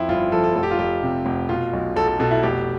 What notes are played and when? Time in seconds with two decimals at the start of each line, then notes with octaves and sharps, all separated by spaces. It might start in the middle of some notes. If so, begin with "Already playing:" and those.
Already playing: F2 F3 E4
0.08 G1 F4
0.32 F3 A4
0.44 A4
0.55 F1 A4
0.63 G4
0.71 F4
0.79 F1 G4
1.03 C3
1.26 F1
1.49 B2 F4
1.73 B1
1.96 B1 A4
2.08 A4
2.20 B2 A4
2.31 E4
2.43 F1 G4